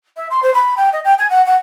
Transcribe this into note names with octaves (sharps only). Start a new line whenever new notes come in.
E5
C6
C5
B5
G5
D#5
G5
G#5
F#5
F#5